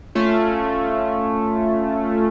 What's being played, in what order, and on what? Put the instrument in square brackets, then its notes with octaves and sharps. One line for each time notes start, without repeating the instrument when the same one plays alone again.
[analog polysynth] A3 C#4 F4